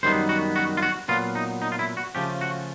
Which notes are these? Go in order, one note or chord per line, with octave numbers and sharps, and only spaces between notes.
F#2 D#3 G3 B3 D#4 C5
F#4
F#4
F4
F#4
A#2 F#3 B3 F4
D#4
D#4
F4
E4
F#4
C#3 F3 A3 C#4 G4
F#4